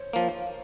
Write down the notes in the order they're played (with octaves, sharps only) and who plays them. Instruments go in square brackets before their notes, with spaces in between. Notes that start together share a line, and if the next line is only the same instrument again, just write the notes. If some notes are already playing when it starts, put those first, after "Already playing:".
Already playing: [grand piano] C5 C#5
[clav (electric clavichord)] F3 A#3